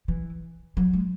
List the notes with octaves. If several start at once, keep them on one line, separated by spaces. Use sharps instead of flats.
E3
F#3
G#3